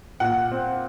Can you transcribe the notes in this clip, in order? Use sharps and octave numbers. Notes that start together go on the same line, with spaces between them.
A#2 F#5
C4